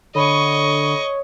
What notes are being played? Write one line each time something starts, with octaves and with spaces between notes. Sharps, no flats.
D3 A4 C#5 D#5 B5 C#6 D#7